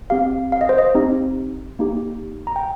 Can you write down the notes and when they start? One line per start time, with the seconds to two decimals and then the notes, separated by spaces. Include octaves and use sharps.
0.10 C4 G4 F5
0.52 F5
0.61 D#5
0.69 C5
0.78 D#5
0.95 C4 D#4 G4
1.79 A#3 D#4 G4
2.47 A#5
2.56 G5